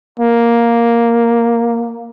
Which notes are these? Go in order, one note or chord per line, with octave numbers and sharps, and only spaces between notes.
A#3